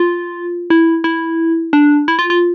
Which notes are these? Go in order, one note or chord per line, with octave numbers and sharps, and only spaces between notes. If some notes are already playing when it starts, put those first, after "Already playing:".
Already playing: F4
E4
E4
D4
E4
F4
F4